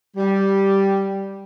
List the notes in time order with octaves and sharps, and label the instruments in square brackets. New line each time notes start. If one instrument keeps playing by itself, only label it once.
[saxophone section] G3